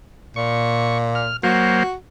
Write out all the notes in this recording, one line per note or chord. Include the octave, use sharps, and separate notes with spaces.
A#2 C#6
F6
F#3 A#3 F#4 C5